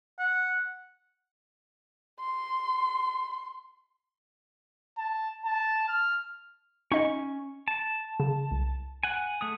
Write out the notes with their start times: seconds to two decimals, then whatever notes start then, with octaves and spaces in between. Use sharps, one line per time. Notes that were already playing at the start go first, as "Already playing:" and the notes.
0.19 F#5
2.20 C6
4.98 A5
5.45 A5
5.88 F6
6.92 C#4 D#4 D#5 C#6
7.68 A5
8.20 C#3
8.51 C2
9.03 F#5 G#5
9.41 A3 G#4 D#6